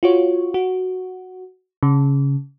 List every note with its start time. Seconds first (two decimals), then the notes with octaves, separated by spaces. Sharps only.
0.03 F4 F#4 C#5
0.54 F#4
1.83 C#3